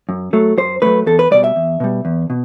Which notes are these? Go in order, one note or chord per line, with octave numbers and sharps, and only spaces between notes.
F#2
F#3 A3
F#2 C5
F#3 A3 B4
E2 A4
B4
B2 G3 D5
E5
E2
B2 G3
E2
B2